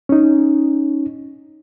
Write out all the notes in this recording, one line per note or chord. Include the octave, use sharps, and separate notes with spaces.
C#4 D#4